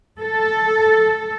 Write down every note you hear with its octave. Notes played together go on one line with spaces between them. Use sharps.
A4